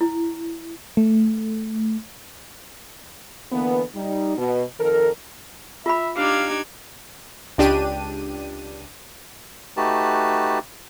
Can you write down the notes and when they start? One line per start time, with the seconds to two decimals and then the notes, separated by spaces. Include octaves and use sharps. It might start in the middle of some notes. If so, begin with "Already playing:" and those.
0.01 E4
0.97 A3
3.52 D3 E3 A#3 B3
3.95 G3 D#4
4.37 B2
4.80 F2 D#3 A4 A#4
5.86 F4 E5 B5
6.17 D4 D#4 G4 F5 D6 G#6
7.58 C#2 D4 G4 D#7
9.77 A3 D#4 F#4 G4 B4 A5